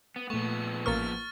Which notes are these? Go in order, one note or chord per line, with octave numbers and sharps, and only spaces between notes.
B3
A#2 F3 A3 B3 C#6
A1 A#3 C#6 F6 A6